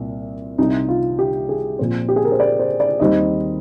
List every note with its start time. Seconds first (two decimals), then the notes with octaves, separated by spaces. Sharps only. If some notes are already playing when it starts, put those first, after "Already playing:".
Already playing: C2 A#2
0.58 C2 C3 G3 D#4
0.89 F4
1.19 G4
1.49 G#4
1.79 A#2 F3 C4 C5
2.09 G4
2.16 G#4
2.25 A#4
2.32 C5
2.40 D5
2.59 C5
2.80 D5
3.00 D#2 D#3 G3 C4 D#5